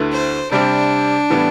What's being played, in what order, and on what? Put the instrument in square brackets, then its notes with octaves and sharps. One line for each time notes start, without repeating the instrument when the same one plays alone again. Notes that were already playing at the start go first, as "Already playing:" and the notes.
Already playing: [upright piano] D2 D3 A3 E4 B4
[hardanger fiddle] C5
[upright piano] C3 G3 C4 [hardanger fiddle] D4
[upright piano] A2 E3 G3 B3